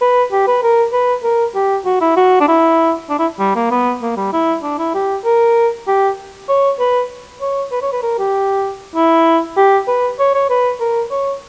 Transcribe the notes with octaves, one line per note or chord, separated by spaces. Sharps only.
B4
G4
B4
A#4
B4
A#4
G4
F#4
E4
F#4
D4
E4
D4
E4
G3
A#3
B3
A#3
G3
E4
D4
E4
G4
A#4
G4
C#5
B4
C#5
B4
C#5
B4
A#4
G4
E4
G4
B4
C#5
C#5
B4
A#4
C#5